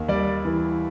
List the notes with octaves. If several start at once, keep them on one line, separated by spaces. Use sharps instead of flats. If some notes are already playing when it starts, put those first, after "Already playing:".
Already playing: D#2
G3 D5
E3